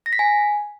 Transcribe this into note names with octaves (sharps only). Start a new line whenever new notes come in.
A#6
B6
G#5